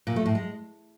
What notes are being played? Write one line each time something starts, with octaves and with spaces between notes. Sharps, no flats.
A#2
A3
A2
G#3